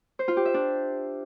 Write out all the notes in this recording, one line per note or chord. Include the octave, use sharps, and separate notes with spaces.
C5
F4
G4
E5
D4